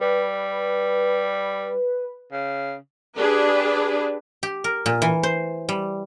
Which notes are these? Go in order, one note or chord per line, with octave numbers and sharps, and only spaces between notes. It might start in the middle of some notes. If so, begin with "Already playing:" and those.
G3 B4
C#3
D4 G4 G#4 B4
G4
A#4
A#2
E3
C5
G3